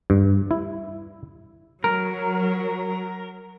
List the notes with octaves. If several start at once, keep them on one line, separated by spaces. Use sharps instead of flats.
G2
E4
F#3 A#4